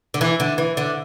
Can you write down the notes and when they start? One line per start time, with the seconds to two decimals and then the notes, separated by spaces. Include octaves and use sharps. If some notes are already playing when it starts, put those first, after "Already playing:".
0.14 D3
0.21 E3
0.40 D3
0.58 E3
0.77 D3